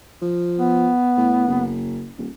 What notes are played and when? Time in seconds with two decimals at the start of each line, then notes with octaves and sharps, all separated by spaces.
0.22 F3
0.59 B3
1.17 A2
1.48 F#1
2.18 D#1